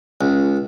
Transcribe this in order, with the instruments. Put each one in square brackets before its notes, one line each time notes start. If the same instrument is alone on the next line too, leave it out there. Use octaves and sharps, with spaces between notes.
[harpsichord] C#2